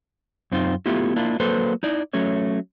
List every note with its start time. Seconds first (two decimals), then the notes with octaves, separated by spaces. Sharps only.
0.52 F#2 C4 D#4 F4
0.86 A3 B3 E4 F4 G4
1.16 A#3 D4 E4 F4
1.40 F#3 A#3 A4 B4 C5
1.83 D#4 E4 D5
2.13 F#3 A3 C#4 C#5